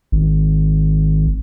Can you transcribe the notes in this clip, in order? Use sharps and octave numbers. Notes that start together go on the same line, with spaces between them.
G#1